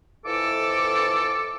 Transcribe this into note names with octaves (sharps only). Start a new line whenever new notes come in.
F2 E3 A4 D6